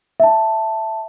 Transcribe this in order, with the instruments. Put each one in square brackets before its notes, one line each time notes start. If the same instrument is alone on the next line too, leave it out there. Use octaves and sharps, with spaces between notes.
[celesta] E5 A5